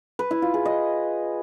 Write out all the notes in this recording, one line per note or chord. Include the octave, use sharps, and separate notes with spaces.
B4
E4
F4
G#4
D#5